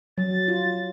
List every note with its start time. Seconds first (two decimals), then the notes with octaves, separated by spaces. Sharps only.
0.18 F#3 A6
0.48 F4